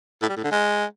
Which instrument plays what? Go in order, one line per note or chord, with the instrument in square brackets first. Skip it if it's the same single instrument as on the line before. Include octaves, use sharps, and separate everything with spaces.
[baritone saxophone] A2
G3
A2
D3
G#3